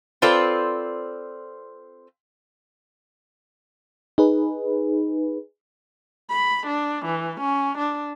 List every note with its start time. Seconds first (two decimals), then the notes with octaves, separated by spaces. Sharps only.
0.22 C4 F4 A4 B4 C5 D5
4.18 D#4 G#4 B4
6.30 B5
6.67 D4
7.06 E3
7.41 C#4
7.78 D4